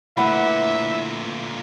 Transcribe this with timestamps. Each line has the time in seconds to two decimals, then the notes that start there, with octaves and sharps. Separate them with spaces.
0.17 A#2 D3 A3 E4 B4 E5 F#5 B5